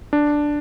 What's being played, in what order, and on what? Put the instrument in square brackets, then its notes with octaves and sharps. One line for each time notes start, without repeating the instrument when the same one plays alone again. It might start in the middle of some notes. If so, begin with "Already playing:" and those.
[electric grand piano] D4